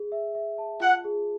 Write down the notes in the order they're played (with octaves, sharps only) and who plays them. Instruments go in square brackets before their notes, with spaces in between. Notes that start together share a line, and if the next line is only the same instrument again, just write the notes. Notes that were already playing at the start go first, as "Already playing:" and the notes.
Already playing: [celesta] G#4
E5
E5
A5
[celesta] F4 [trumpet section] F#5
[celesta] G#4